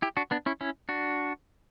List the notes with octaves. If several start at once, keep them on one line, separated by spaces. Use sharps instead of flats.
E4 G4
D4 F#4
B3 D4
C#4 E4
C#4 E4
D4 F#4